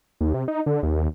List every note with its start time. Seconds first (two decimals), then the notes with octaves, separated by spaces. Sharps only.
0.21 D#2
0.34 C3
0.48 D#4
0.66 D3
0.83 D#2